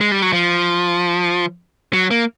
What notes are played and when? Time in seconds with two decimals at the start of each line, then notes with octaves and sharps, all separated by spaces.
0.01 G#3
0.12 G3
0.22 F#3
0.33 F3
1.93 F#3
2.11 A#3